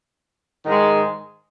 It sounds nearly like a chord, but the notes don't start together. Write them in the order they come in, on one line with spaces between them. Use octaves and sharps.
D#3 G#2 G#3